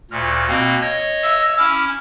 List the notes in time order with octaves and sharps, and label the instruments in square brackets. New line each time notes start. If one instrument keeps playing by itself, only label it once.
[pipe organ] D2 A#2 F6
B2 A#3 C4
C#5 D#5
[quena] E6
[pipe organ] C#4 E4 D6 [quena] F6